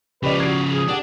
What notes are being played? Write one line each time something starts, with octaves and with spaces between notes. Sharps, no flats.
C#3 F3 G4 B4 D5
F#4 G#6 C7 D7
G#4
D4 G4 F#5